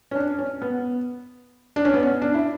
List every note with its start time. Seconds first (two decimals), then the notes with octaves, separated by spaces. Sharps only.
0.11 C#4
0.16 D4
0.38 C#4
0.62 B3
1.76 D4
1.85 C#4
1.94 B3
2.03 C#4
2.22 D4
2.34 E4